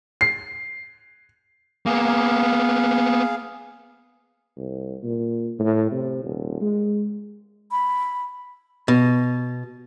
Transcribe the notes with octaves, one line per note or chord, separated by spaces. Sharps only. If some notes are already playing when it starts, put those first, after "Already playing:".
C7
A#3 B3 G#4 F5
C2
A#2
A2
C3
D#1
G#3
B5
B2